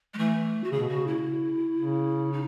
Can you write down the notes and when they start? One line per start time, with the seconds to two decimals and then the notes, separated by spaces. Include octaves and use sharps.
0.13 G#3
0.17 E3 A3
0.63 F#4
0.71 C#3 G#4
0.80 B2
0.88 C#3 F#4
1.07 E4
1.78 C#3
2.32 D#4